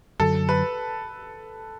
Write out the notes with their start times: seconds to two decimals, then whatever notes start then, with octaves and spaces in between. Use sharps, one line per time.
0.20 F#2 D3 F#3 A4
0.49 B4